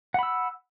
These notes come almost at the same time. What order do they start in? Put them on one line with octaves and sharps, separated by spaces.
F#5 B5 E6